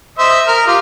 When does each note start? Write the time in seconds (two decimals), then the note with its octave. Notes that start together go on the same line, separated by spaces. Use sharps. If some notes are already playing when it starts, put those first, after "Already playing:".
0.18 C5 D#5 E5
0.48 A#4 F6
0.67 F4 G4